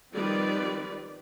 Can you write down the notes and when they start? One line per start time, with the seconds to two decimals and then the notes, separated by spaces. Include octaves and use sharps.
0.14 D#3 F3 G3 C4 B4 D5